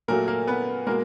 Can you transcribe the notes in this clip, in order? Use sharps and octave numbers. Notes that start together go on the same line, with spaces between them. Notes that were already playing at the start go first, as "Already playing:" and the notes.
A#2 F#3 A3 A#3 A#4
A#3 A#4
B3 B4
B2 G#3 A#3 A#4